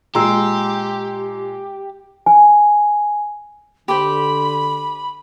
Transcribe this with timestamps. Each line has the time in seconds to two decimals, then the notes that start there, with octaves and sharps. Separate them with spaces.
0.15 A#2 G#3 G4 A#5 C6 E6
2.26 G#5
3.88 D3 G4 C5 B5